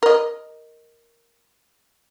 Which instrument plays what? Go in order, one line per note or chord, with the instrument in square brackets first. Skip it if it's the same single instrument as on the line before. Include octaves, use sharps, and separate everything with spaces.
[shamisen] A#4 D#5